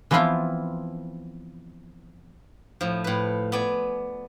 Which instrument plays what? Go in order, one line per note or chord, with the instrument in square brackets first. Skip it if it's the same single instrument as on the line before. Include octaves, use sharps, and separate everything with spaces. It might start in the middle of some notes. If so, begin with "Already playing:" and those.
[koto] E3 F3 B3 C4 E4 F4
[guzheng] A2 F3
A2 B4
B3 D5 G#5